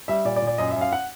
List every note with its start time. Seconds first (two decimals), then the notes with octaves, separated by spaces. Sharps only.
0.08 G3 E5
0.25 A#2 D5
0.36 D5
0.42 A#2
0.47 D5
0.58 F#2 D#5
0.70 E5
0.76 F#2
0.81 F5
0.92 F#5